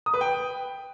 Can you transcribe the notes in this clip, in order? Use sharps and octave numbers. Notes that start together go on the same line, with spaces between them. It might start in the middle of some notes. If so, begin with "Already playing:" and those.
D#6
B4
G5